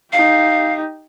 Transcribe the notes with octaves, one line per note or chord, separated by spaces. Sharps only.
D#4 G4 F5